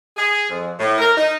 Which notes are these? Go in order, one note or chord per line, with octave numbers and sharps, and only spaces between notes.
G#4
F2
A2
A#4
D#4